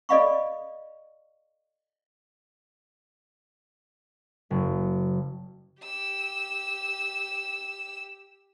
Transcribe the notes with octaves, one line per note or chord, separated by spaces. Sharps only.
A4 D5 D#5 F5 B5 C#6
F#1
G4 E6